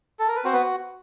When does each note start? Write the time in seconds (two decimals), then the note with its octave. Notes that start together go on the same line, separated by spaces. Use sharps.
0.19 A4
0.28 A#4
0.36 B4
0.44 C4 F#4 C5
0.53 B3 B4